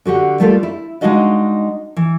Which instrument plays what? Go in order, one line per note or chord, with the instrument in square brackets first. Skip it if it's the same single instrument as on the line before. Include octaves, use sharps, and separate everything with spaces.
[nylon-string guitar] D3 F#4 G4 F#5
G3 A3 A#3 F4 A4
E4
G#3 D4 D#4 F#4 D#5 F5
E3